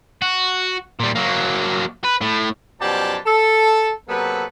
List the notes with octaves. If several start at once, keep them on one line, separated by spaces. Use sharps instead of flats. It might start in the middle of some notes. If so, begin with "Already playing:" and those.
F#4
A#2 G3
F#3 A#3
B4
A2
F#2 B2 F3 G4 D5 A5
A4
C3 F#3 A#3 B3 A4 B4